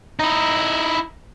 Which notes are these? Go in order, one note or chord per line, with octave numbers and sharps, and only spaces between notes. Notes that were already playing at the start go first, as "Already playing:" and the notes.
D#4 E4